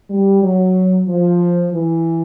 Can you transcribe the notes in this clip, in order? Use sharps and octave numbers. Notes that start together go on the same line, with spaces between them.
G3
F#3
F3
E3